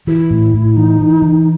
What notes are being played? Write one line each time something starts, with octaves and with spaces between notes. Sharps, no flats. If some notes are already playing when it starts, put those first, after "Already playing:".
E3 E4
A2
A2
E3 D#4
E3
E3